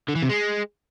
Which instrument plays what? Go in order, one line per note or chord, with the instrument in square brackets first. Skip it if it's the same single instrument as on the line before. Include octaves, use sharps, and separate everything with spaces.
[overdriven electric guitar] D3
E3
C3
G#3